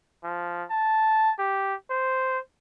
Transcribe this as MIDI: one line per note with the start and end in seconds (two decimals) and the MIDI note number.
0.24 0.64 53
0.70 1.32 81
1.39 1.74 67
1.90 2.39 72